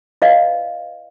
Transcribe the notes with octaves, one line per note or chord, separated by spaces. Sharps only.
E4 B4 D5 D#5 F5